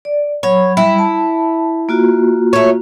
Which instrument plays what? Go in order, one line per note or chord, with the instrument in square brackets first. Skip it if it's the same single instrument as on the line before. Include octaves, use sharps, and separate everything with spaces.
[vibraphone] D5
[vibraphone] F#3 B5 [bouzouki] C#5
[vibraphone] G3 [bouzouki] E4
[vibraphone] A5
A#3 F4 F#4
[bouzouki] A3 C#5